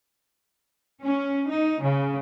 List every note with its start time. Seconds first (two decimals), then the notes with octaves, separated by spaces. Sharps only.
1.02 C#4
1.49 D#4
1.81 C#3